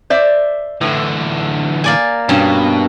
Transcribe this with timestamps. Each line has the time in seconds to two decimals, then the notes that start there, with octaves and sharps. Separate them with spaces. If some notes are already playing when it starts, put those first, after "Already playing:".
0.10 C5 D5 E5
0.81 A2 D3 E3
1.84 A#3 D5 G#5
2.29 G2 B2 C#4